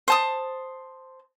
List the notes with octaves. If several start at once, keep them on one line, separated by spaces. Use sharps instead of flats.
C5 A5 D#6